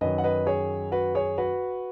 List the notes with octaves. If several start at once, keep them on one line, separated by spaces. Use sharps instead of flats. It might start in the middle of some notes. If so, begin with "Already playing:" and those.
F#2 D#3 F#3 B4 D#5
F#5
B4 D#5
G#4 C#5
F#4 B4
G#4 C#5
F#4 B4